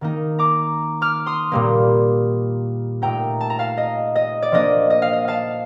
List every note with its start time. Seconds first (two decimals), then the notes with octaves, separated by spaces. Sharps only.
0.01 D#3 A#3 D#4
0.39 A#5 D6
1.01 D6 F6
1.26 C6 D#6
1.52 A#2 G3 A#3
3.02 A#2 A3 D#4 G5 A#5
3.41 A5
3.50 A#5
3.59 F5 A5
3.77 D#5
4.15 D#5
4.42 D5
4.52 F3 A#3 D4 D#5
4.90 D#5
5.02 F5
5.13 D#5
5.28 F5 A5